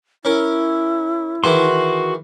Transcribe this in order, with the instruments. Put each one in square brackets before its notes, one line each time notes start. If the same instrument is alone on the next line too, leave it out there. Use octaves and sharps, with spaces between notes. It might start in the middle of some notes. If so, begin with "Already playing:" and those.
[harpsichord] C#4 A#4 [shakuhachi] E4
[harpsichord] D#3 E3 G#4 [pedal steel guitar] F#4 C6